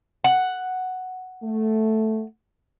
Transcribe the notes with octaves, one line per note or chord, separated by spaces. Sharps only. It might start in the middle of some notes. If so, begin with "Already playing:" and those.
F#5
A3